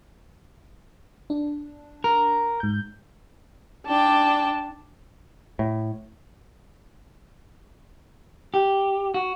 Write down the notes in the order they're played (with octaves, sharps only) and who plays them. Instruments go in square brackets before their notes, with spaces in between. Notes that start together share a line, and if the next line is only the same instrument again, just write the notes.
[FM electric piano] D4
[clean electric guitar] A#4
[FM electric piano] G#2 G6
[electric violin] D4 A5 [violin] D5 G5
[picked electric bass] A2
[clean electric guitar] G4
F#4